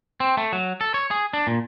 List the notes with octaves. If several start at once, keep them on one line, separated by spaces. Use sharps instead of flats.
C4
A3
F#3
A4
C#5
G#4
D4
A#2